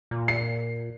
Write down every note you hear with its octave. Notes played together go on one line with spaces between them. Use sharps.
A#2
C7